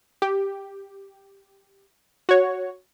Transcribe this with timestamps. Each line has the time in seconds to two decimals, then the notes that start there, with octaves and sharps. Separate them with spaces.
0.22 G4
2.29 F#4 C#5